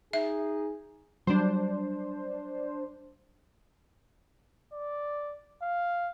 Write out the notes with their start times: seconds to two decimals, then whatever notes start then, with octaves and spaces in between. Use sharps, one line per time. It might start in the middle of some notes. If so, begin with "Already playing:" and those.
0.13 D#4 G#4 E5
1.27 F#3 G3 D4 C5
4.73 D5
5.62 F5